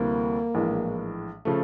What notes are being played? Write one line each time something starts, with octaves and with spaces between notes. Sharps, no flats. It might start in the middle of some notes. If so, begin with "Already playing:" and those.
Already playing: D2 C3 E3 G3 A#3
A#1 A2 E3 G#3
C#3 F3 A3